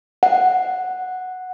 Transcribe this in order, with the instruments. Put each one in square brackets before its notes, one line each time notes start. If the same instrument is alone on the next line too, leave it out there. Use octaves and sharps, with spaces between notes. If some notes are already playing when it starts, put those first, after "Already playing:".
[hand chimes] F#5